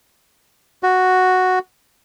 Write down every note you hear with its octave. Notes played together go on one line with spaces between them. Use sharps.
F#4